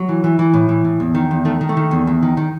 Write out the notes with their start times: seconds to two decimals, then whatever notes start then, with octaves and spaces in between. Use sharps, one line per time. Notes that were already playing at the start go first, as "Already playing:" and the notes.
Already playing: F#3
0.09 E3
0.24 E3
0.39 E3
0.53 A2
0.69 E3
0.84 A2
1.00 E2
1.15 D#3
1.31 E2
1.45 D#3 A3
1.61 D#3
1.69 A3
1.77 D#3
1.91 E2
2.07 E2
2.23 D#3
2.37 D#3